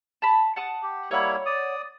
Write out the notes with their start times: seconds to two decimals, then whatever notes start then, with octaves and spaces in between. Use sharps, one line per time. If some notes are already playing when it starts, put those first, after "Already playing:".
0.22 A5 B5
0.56 F#5 A5 D#6
0.83 G4
1.11 G3 A#3 E4 C#5 F#5
1.46 D5 D#6